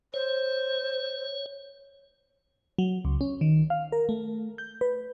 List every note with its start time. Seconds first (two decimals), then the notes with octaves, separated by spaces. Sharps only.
0.14 C5 C#5
2.79 F#3
3.05 C#2
3.21 C#4
3.41 D#3
3.70 F5
3.92 A#4
4.09 A3
4.58 G6
4.81 B4